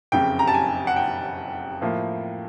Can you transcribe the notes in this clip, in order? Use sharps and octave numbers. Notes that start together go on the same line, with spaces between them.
F#1 F2 C#3 G5
A#5
A5
G#5
F#5
G5
A2 F3 A#3